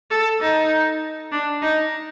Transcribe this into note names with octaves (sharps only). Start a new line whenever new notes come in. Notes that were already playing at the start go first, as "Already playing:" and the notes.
A4
D#4
D4
D#4